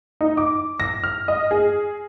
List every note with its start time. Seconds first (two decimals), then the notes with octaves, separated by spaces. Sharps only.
0.21 D#4
0.37 D6
0.80 A#6
1.04 F6
1.28 D#5
1.51 G#4